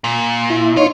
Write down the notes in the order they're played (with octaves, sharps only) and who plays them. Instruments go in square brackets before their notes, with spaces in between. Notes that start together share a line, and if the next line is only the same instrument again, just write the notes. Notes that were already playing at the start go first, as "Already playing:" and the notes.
[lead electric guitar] A#2
[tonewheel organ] E4
[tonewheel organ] D#4 C#5 [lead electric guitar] F4